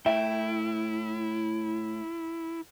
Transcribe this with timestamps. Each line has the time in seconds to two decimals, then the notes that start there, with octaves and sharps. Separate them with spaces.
0.06 A2 E4 E5 G5